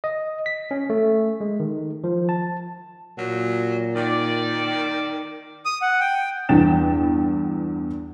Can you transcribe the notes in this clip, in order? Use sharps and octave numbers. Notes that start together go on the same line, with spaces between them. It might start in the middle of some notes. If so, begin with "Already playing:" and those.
D#5
B6
C#4
A3
G#3
D#3
F3
A5
A#2 F#3
D#3 D5
D#6
F#5
G5
E2 G2 B3 G5 A6 E7